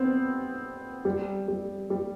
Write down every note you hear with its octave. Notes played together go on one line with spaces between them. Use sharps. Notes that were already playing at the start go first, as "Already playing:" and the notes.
Already playing: B3 C4
G3
G3
G3